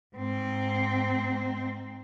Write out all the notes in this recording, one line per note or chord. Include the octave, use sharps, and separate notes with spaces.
G#2 C4